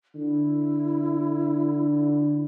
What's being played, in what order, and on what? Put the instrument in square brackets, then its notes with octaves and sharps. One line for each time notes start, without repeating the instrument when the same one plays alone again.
[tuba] D3 [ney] E4